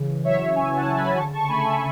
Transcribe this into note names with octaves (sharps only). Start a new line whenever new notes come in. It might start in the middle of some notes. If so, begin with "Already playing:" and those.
Already playing: C#3 E3
F#3 C#5 E5
C#4 E5 G#5
F#5 A5
C#3
G#5 B5
D3 A5 C#6
A5 C#6
A3 G#5 B5
E5 G#5